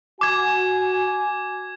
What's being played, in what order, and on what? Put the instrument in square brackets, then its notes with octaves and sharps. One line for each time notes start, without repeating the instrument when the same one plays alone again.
[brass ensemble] F#4 G#5 [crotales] D6 G#6